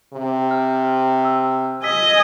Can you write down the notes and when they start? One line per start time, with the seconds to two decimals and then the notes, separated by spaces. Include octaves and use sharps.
0.14 C3
0.51 F6
1.25 E6
1.83 D#5 G#5 E6 B6